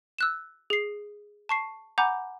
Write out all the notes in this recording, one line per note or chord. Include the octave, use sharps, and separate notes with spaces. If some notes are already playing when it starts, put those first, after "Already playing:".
E6 F#6 E7
G#4 C7
A5 C#6 C7
F#5 G#5 A#5 B5 D6 G6